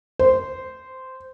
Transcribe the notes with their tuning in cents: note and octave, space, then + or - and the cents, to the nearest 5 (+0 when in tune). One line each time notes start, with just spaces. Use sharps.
C5 -10